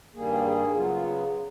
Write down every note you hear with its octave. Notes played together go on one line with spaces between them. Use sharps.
G2 D#3 G3 A#3 G#4
G#4
C#3 F#3 B3 F4
F4